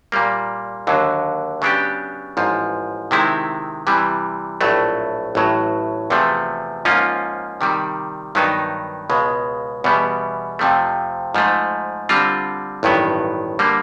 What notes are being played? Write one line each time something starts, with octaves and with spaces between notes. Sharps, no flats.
A#2 G3 A#3
D#2 D3 F#3
C#3 F#3 B3 D4 G4
A1 G#2 F3
C3 D#3 G#3 C4 E4
C3 E3 G3
A#1 A2 F#3 A3
A1 A2 F#3
E2 C3 F3 A3
G#2 F3 A#3 C#4 F4
C3 D#3 G3
G2 D#3 F#3 B3 D#4
C#2 B2 G#3
E2 B2 G3 B3
F2 C3 F3 A3
G#2 F3 A3
D3 G3 C4 F4
A1 G2 D#3 F#3 B3
D3 G3 A#3